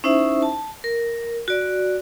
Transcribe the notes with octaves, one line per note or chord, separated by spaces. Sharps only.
C#4 D#4 E4 C5 E5
A5
A#4
F#4 D5